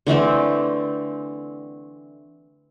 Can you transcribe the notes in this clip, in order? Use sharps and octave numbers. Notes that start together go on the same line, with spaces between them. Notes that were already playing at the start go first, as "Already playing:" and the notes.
D3 E3 A3 C4